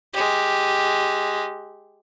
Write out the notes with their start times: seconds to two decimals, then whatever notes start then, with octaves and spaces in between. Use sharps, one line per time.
0.13 G#3 G4